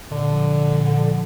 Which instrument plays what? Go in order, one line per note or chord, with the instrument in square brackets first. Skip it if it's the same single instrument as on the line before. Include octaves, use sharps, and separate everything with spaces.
[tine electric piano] A#2 [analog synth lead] D3
[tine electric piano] F3
A#2
A#2
F3